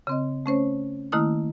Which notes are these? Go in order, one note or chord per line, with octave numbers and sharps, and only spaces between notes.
C#3 C4 D#5
A3 C#4 C5 C#5
D#3 A3 A#3 E4 D#6 F6